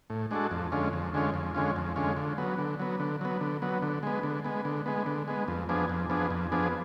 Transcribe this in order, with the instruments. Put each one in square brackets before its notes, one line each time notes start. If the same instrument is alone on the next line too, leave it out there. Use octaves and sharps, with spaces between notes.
[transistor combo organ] A2
G#3 D4 F#4 A4
F2
D3 G#3 C#4 F4
F2
D3 G#3 C#4 F4
F2
D3 G#3 C#4 F4
F2
D3 G#3 C#4 F4
D3
F#3 B3
D3
F#3 B3
D3
F#3 B3
D3
F#3 B3
D3
G#3 B3
D3
G#3 B3
D3
G#3 B3
D3
G#3 B3
F2
F3 B3 D4 G#4
F2
F3 B3 D4 G#4
F2
F3 B3 D4 G#4